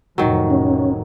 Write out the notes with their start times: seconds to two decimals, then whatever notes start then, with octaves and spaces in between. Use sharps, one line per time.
0.18 F1 A2 D#3 F#3
0.50 C#4